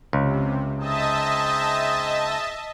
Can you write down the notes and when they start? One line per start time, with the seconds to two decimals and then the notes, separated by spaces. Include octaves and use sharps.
0.13 C#2 C3
0.79 C4 D#4 G#4 D#5 E5 A5